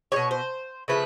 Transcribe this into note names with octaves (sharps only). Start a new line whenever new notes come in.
B2 G3 C#5
C5
C#3 F3 A3 B4